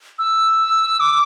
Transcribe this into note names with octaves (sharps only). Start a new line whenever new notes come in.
E6
D6